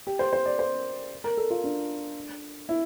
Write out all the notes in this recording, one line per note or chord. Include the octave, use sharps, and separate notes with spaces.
G4
C5
C5
D5
C5
A#4
A4
F4
D4
E4